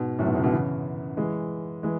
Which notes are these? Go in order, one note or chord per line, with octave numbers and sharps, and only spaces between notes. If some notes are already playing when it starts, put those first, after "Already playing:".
Already playing: G#2 B2
F#2 A2
G#2 B2
A2 C#3
B2 D3
C#3 E3
E3 G#3
E3 G#3